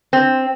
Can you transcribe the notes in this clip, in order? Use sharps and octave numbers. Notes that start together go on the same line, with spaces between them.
C4